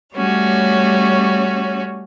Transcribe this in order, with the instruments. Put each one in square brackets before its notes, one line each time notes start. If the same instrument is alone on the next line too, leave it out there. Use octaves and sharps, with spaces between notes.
[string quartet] G3 A3 C#4 F#4 C#5